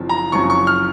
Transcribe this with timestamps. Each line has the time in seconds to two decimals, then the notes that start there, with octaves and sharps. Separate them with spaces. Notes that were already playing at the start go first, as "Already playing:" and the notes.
Already playing: F#1 F#2 F3 C4
0.09 A#5
0.32 F#1 F#2 F3 C4 C#6
0.50 C#6
0.67 F6